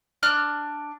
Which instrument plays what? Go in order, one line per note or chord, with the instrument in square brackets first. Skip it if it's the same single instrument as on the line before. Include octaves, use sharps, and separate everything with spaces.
[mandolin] D4 D5 F6 F#6